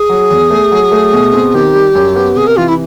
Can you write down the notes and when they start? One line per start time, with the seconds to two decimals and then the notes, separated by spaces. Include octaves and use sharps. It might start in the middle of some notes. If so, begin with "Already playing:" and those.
Already playing: G#4
0.09 F#3
0.31 E2
0.50 A3
0.72 F#3
0.92 A3
1.13 B2
1.33 C4
1.54 D#3 G4
1.74 G3
1.95 F#2
2.16 B3
2.36 C3 G#4
2.47 A#4
2.56 E3 F4
2.68 E4